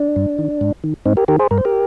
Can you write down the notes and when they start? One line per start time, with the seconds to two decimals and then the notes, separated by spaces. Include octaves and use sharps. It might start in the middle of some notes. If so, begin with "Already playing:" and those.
Already playing: D4
0.16 G2
0.38 D#3
0.61 G#2
0.84 D#3
1.06 G#2 C4 D#4
1.17 G4 A#4
1.28 D#3 G4 A#4
1.39 G#4 C5
1.51 G2 A#4
1.58 C5
1.65 G4 A#4